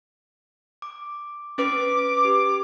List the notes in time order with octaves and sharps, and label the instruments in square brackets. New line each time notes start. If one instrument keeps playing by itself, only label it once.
[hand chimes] D6
[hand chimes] C#4 B4 [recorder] D6
[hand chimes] G4